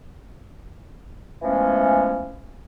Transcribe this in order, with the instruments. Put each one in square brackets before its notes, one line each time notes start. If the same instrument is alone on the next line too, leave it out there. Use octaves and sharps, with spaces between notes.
[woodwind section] E3 F3 G#3 A3 B3 C#4